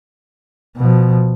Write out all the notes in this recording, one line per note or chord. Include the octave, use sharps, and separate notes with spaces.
B2 F3